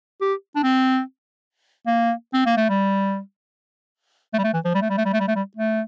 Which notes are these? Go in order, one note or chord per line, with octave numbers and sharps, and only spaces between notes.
G4
D4
C4
A#3
C4
A#3
A3
G3
A3
G3
A3
E3
F3
G3
A3
G3
A3
G3
A3
G3
A3
G3
A3